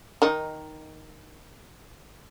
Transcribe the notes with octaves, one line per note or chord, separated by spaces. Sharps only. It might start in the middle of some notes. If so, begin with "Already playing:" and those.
D#3 D#4